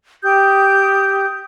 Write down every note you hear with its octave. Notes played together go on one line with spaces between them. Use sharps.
G4 G5 D#6 G6